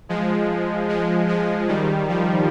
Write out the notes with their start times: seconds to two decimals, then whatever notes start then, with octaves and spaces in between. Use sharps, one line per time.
0.09 F3 G#3
0.88 F3 G#3
1.28 F3 G#3
1.68 D#3 G3
2.09 F3